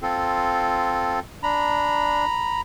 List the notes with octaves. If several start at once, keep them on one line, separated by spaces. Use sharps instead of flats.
C4 F4 A4
D4 A#5 B5